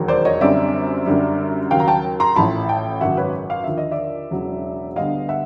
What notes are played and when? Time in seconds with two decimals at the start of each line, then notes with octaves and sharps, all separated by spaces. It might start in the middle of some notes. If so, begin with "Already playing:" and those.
Already playing: E1 D#2 D#3 F#3
0.08 C5 D5
0.25 C#5 D#5
0.41 F#2 D3 G3 C4 D5 E5
1.06 F#2 D3 G3
1.71 D#2 C#3 F#3 F5 G5
1.80 A#5
1.88 G5 A5
2.20 A#5 C6
2.36 A1 A2 F3 A5 B5
2.69 G5 A5
3.01 G#1 F#2 C#3 F#3 E5 F#5
3.17 B4 C#5
3.50 F5
3.64 D#2 D3 F3 E5
3.78 D#5
3.91 D5 E5
4.31 E1 E2 C#3 F#3
4.96 D2 D3 G3 B3 D#5 F5
5.29 E5 F#5